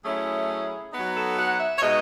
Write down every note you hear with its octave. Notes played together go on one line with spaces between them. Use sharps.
F#3 A3 C#4 E4 G#4
F#3 B3 D#4
A4
F#5
E5
C#5
B2 G#3 D#4 D#5